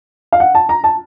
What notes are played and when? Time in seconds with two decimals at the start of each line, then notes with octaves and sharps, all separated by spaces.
0.32 F5
0.40 F#5
0.55 A5
0.69 A#5
0.84 A5